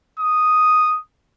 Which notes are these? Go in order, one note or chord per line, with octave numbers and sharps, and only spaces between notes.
D#6